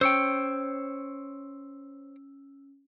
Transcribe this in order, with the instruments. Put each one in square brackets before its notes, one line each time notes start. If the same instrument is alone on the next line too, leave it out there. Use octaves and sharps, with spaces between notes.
[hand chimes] C#4 [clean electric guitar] C5 C#5 G5 [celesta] E6